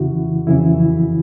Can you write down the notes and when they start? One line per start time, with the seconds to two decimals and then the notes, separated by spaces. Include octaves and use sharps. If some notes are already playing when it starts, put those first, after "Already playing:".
Already playing: F2 C#3 E3 E4 F#4
0.47 F2 C#3 E3 E4